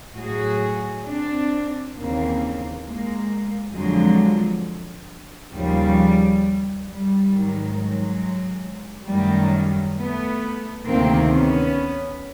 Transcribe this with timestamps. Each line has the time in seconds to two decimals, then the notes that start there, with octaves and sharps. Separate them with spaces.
0.16 A2 F#3 F#4 G#4
1.06 C4 D4
1.95 D#2 C#3 E3 A#3 C4
2.84 G#3 A#3
3.73 F2 D3 F3 F#3 G#3
5.52 D#2 C#3 F3 G3
6.85 G3
7.30 G#2 D#3 F#3
7.75 F#3 G#3
9.08 F#2 D#3 F#3 G3 A3
9.98 A3 B3
10.87 D2 C3 D#3 A#3 C4
11.32 B3 C#4